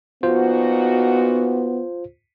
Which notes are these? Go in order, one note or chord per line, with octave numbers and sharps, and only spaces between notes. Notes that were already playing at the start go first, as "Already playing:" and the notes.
A#2 B3 D#4 F4 F#4 C5